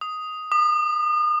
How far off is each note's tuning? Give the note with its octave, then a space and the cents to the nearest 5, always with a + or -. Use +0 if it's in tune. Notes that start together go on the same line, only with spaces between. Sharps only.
D#6 +5
D#6 -35